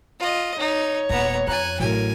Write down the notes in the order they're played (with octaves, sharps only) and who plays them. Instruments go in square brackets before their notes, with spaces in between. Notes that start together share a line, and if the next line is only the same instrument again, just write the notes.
[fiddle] F4 D#5
[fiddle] D#4 [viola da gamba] C#5
[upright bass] D#1 A#2 [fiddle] B3 A#5
[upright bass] F2 [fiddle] G#5 F#6 [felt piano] A#5 A6
[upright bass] A1 [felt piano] A2 F#3 [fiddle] A#4 G#5